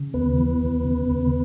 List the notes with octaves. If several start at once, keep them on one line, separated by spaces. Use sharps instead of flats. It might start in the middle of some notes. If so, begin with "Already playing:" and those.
Already playing: C#3
D#2 B3 B4
E3
D#2
C#3
D#2